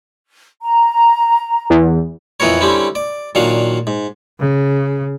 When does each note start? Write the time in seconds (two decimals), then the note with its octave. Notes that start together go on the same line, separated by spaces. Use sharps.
0.61 A#5
1.70 E2
2.40 F2 E3 B3 A#4 C#5
2.61 D3 G3 C4 C#4 E4
2.95 D5
3.35 A#2 D#3 F#3 D4 F5
3.87 G#2
4.39 C#3